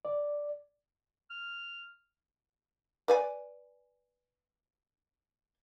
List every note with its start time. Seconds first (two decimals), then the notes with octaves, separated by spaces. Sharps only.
0.05 D5
1.30 F6
3.08 B4 D5 G#5